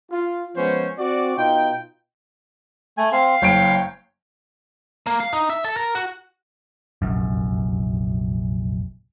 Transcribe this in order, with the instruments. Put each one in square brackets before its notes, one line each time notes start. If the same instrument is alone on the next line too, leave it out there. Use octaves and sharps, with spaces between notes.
[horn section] F4
F3 G#3 B3 C#4 C5
C4 F#4 D5
B2 D#4 F4 G5
[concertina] A3 G#5
[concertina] C4 [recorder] F5
[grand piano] F#1 D7 [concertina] C#5 G5
[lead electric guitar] A#3
F5
D#4
E5
A4
A#4
F#4
[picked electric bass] F1 A#1 F#2